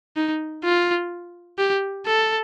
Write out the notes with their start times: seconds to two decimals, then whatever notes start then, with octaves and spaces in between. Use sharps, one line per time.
0.16 D#4
0.64 F4
1.58 G4
2.06 A4